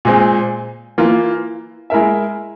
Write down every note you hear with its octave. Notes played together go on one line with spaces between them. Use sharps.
A#2 G#3 C4
E3 A#3 F4
G#3 E4 A#4 E5